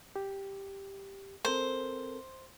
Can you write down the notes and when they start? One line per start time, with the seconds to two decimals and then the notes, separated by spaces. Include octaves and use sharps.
0.16 G4
1.45 C4 A4 A#4 C5